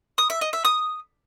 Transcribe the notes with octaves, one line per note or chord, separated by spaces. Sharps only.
D#6
E5
D#5
E5
D#6